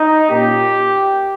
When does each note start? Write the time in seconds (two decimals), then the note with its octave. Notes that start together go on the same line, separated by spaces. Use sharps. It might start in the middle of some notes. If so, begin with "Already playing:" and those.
Already playing: D#4
0.30 A#2 A#3 C#4 G4